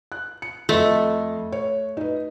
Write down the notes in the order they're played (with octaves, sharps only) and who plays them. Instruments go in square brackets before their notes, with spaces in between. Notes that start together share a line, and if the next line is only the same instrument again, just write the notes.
[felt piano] F#6
C#7
[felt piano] F2 D#5 C6 [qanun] A3
[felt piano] C#5
D#4 B4